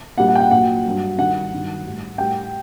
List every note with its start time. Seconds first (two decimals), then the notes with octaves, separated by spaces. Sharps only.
0.18 A#2 G3 F#5
0.28 F#5
0.35 G5
0.40 F#5
0.51 A#2 F#3 F#5
0.85 G2 F#3
1.18 G2 D#3 G3 F#5
1.52 G2 D#3 F#3
1.85 A2 G3
2.18 A2 G3 G5